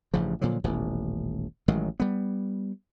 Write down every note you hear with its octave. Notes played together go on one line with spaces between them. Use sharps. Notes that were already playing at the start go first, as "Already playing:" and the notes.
A1 G2 C#3 F3
A#2 D3 F3 F#3
D#1 A1 B2
A1 D#3 F#3 G#3
G3 B3